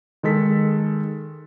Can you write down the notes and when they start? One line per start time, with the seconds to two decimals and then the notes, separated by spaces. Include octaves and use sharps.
0.23 D#3 G#3 A4 B6